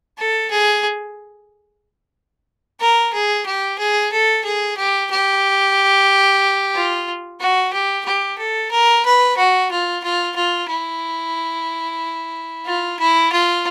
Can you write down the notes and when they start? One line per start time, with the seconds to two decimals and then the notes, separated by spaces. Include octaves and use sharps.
0.18 A4
0.50 G#4
2.80 A#4
3.13 G#4
3.46 G4
3.78 G#4
4.12 A4
4.44 G#4
4.77 G4
5.11 G4
6.75 F4
7.40 F#4
7.73 G4
8.06 G4
8.38 A4
8.71 A#4
9.05 B4
9.37 F#4
9.71 F4
10.03 F4
10.36 F4
10.69 E4
12.65 F4
13.00 E4
13.32 F4